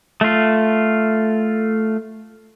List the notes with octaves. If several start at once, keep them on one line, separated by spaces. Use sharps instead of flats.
A3 F4